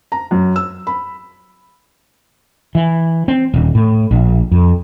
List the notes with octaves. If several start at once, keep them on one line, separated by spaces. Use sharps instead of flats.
A#5
F#2
E6
B5
E3
C4
D#1
A2
A#1
F2